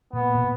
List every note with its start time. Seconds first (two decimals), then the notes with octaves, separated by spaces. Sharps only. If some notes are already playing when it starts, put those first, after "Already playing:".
0.13 A#2 B3
0.35 B2